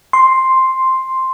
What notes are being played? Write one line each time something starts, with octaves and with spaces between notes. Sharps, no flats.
C6